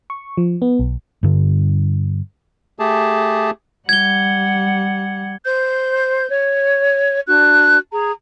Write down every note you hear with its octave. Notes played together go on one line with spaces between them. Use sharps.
C#6
F3
B3
B1
G2 D3
A3 G4 G#4 A5
G3 F#5 G#6 G7
C5 G6
C#5
D4 F#4 F#6
G#4 A#5